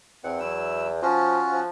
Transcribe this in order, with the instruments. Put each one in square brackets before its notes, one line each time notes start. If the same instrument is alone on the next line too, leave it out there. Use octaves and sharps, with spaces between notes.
[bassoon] E2 [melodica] C4 F#5
[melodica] F#3 E4 E6
[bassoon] F3 [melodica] C#4 F4 F#4
[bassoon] F3